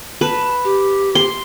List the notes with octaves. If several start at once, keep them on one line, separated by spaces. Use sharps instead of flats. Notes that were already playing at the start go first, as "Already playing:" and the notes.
B4 A5
G4
C6